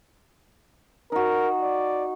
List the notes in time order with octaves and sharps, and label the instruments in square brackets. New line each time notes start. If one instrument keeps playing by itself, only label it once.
[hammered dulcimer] D#4 F#4 [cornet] A#4
[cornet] D5